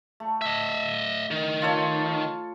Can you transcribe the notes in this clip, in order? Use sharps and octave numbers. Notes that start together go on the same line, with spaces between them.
A3
D#5 E5
D#3
F4 A4 C#5